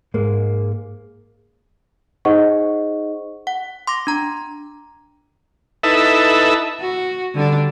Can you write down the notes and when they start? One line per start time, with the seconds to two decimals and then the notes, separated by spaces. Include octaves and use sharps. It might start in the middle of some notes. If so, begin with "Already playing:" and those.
0.14 G#2 G#3 A#3
2.25 D#4 G#4 C5 D#5 F#5 C#6
3.47 F#5
3.87 C6 D6 A#6
4.07 D4 A#5
5.83 D#4 E4 A4 B4 E5
6.80 F#4
7.34 D3 G3 D4